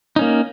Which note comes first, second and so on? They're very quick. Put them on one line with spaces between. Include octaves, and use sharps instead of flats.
D#4 C#4 A#3